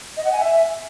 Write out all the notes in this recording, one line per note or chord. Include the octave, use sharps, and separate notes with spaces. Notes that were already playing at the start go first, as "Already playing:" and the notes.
D#5
F#5
G#5
E5